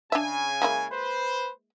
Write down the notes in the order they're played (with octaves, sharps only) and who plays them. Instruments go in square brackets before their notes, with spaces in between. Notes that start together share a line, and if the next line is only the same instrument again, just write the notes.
[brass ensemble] C#3 G#5 [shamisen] D4 E5
[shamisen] G#3 A#3 E4
[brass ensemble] B4 C5